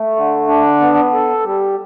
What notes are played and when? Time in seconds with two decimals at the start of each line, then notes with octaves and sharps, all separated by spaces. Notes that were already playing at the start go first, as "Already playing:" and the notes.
Already playing: A3
0.16 D3
0.48 D4
0.80 B3
1.13 A4
1.44 G3